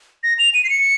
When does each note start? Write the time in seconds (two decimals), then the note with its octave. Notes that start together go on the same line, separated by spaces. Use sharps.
0.23 A#6
0.39 F7
0.54 D#7
0.64 C7
0.69 C#7